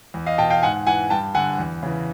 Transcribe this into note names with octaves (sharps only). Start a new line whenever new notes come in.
E2
D#5 F5
B2 G5 A5
F5 G5
G#2 F#5 G#5
E3 F#5 G#5
G2 G5 A5
D3 F#5 G#5
E2
C#3 E3